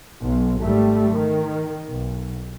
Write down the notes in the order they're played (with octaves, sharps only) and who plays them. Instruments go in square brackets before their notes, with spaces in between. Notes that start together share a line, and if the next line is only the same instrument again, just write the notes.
[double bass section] B1
G#1 G3 A3
D#3
B1